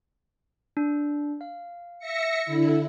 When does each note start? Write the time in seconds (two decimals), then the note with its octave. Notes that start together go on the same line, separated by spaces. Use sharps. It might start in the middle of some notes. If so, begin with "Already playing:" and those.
0.77 D4
1.41 F5
1.99 E5 A#6 C#7
2.46 D3 E4